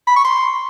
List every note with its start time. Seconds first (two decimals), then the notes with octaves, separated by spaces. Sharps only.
0.07 B5
0.16 C#6
0.25 C6